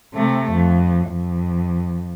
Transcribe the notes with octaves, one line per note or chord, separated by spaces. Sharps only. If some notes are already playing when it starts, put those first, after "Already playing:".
C3 A3
F2
F2